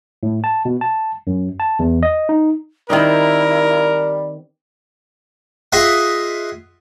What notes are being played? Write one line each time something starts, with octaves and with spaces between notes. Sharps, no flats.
A2
A5
B2
A5
F#2
A5
E2
D#5
D#4
D#3 G3 C4 D#4 E4 A#4
F4 G#4 D#5 E5 F#5